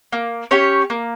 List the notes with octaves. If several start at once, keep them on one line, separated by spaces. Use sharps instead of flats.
A#3
C#4 G4 C#5
A#3